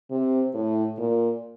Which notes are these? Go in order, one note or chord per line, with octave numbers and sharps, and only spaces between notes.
C3
A2
A#2